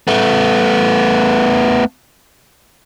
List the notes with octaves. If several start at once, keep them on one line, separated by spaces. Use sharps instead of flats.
A3 B3